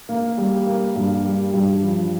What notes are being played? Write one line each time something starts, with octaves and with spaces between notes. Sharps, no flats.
A#3
G3
A#3
G2
G3
G2
F3